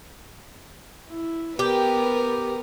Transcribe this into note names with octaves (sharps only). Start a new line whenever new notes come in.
E4
B3 G4 A#4 B4